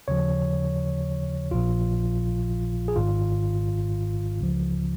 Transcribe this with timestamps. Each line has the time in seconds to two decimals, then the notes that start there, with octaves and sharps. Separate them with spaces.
0.08 D#2 C#3 F3 C#5
1.51 A#1 A#2 F3 F4
2.88 G#4
2.96 G#1 G#2 D#3 F4
4.41 C#2 C#3 F3